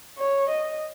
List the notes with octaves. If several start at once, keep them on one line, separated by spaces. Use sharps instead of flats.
C#5
D#5